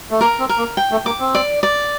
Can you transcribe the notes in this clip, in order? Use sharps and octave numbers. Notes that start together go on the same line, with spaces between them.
A3
A#3 A#4
C4
A#4
A#3
G5
A3
A#3 D6
C4
D5
D5